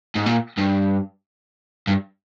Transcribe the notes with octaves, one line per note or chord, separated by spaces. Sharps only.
G#2
A#2
G2
G2